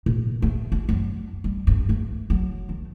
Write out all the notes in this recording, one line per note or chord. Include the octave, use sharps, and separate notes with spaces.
A#2
A3
F4
F#2
G3
G2
A3
F#3
D#3